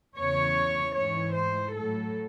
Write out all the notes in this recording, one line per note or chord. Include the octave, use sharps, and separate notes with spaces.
E2 C#3 E3 C#5
G#2 E3 C#5
C5
A2 F#3 A4